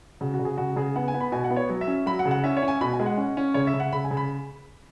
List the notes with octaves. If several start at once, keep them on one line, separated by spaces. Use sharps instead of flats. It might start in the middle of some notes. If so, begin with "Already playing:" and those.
C#3 F#4
F#4
C#3
G#4
C#3 F#4
C#3 G#4
B3 F#5
G#5
B3
B5
B2 G#5
F#5
B3
C#5
F#3
E5
C#4
F#3 B5
F#5
C#3
F#5
C#4 E5
C#5
C#4
G#5
B2 B5
G#5
G#3
F#5
C#4
C#4
C#3 C#5
E5
C#3
F#5
C#3 B5
G#5
C#3
B5